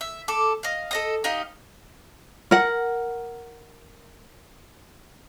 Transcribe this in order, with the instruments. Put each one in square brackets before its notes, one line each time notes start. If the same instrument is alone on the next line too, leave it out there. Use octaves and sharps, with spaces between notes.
[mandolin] E5
A4 D6
D#5 F5
A4 D#5 D#6
D#4 G4 D#5 F5
[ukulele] A#4 F#5